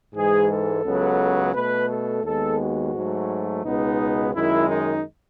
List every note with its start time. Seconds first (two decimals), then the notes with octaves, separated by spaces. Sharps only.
0.15 G#2 E3 G#3 G#4
0.49 A4
0.84 C#2 C#3 F#3 B3
1.54 B2 A3 B4
1.90 A4
2.24 D#2 D#3 G#3 B3 A4
2.59 F#4
2.95 G#2 F#3 A3
3.64 C#2 B2 G#3 B3 D#4
4.34 F#2 D#3 G#3 E4
4.68 D#4